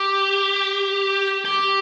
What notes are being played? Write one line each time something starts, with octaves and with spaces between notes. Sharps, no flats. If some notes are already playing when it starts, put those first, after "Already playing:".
Already playing: G4
G4